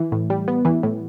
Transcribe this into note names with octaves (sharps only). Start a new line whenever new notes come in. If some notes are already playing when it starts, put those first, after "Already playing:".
Already playing: E3
A2
G3
B3
E3
A2